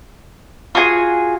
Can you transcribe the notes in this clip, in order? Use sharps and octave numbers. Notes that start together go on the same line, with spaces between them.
F4 F#4 G#4 G#5